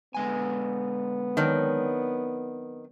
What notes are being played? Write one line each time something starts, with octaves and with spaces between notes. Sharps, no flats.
D3 G#3 B3 G#5
D#3 F#3 C4 D4